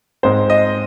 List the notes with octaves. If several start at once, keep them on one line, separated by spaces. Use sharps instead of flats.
G#2 G#3 C4 C5
D#5